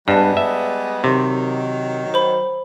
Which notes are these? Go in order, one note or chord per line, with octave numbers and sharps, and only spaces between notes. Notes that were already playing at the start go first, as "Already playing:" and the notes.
G2 G3 G#3 B3 D5 A5
E5
C3 D#3 F#3
C5 B5